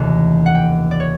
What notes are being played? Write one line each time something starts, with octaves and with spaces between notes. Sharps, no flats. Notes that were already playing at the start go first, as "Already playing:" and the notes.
Already playing: F1 D#2 C#3 E3 A3
F#5
G5
D5
C#5